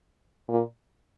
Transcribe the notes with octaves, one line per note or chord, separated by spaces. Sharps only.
A#2